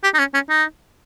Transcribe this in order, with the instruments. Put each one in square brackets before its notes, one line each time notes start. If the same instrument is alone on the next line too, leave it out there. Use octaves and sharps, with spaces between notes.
[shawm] G4
D#4
C#4
C#4
D#4